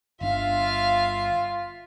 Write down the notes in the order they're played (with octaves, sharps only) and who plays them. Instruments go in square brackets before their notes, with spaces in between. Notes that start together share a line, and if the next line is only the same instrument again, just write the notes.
[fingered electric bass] G1 D4 [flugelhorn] F4 [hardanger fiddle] E5 F5